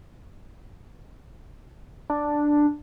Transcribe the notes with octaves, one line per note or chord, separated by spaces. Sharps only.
D4